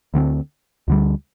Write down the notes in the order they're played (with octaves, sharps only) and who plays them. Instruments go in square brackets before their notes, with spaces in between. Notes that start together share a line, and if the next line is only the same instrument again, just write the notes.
[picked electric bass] D2 D3 A3 C4
D2 D3 G3